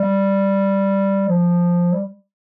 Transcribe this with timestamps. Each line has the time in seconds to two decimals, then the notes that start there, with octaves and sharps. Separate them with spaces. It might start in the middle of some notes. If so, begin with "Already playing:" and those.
Already playing: G3
1.28 F3
1.93 G3